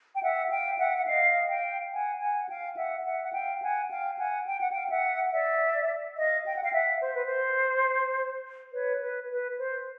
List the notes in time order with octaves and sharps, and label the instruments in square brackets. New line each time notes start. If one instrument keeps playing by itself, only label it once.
[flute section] G5
E5 F#5
F5 G5
E5 F#5
F#5
D#5 F5
F5 G5
F#5 G#5
F#5 G#5
F#5
F5 G5
E5 F#5
E5 F#5
F#5
F5 G5
F#5 G#5
F5 G5
F#5 G#5
G5
F#5
F5 G5
E5 F#5
D5 E5
D#5 F5
G5
F#5
F5 G5
E5 F#5
C5
B4
C5
B4 C#5
B4
B4
C5